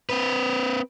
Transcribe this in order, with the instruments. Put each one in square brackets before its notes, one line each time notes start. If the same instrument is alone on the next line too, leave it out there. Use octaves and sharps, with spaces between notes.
[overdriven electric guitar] C4 B4